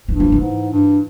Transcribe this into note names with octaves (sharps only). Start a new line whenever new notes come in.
G2 E3
F3
E3
G#2
G2